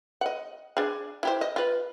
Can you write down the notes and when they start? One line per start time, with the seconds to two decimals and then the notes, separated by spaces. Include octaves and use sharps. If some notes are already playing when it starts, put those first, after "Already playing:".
0.21 D#5 F#5
0.77 D4 G#4
1.23 E4 G4 C5
1.41 D#5
1.56 F4 B4